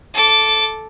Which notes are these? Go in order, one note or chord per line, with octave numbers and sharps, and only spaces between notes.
A4 D6